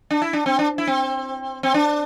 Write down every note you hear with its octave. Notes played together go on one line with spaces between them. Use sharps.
D4
E4
D4
C4
D4
E4
C4
C4
D4